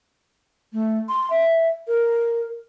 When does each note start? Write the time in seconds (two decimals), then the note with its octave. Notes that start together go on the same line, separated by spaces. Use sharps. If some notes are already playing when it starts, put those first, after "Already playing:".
0.73 A3
1.09 C6
1.30 E5
1.88 A#4